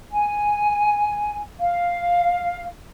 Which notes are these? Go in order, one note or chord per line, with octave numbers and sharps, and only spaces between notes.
G#5
F5